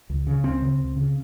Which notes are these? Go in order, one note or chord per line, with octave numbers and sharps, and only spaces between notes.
C#2
C#3
C#2 C4
C#3
C#2
C#3